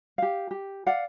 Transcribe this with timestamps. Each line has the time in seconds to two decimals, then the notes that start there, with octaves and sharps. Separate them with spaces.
0.18 G4 F5
0.51 G4
0.87 D5 F5 F#5